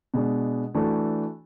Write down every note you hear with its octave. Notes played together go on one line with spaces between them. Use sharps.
B2 G#3 D4
E3 A3 D4 F#4 A4